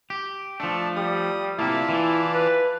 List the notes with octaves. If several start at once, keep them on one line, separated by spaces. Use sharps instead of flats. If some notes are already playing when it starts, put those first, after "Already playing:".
G4
F3 A3 D4
G3 D#6
C3 A#3 E4 F4 D5 A5
E3
B4